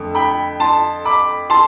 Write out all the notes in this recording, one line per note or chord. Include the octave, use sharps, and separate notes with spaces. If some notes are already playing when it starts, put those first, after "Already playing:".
Already playing: F2 D3 A3
G5 B5
A5 C6
B5 D6
A5 C6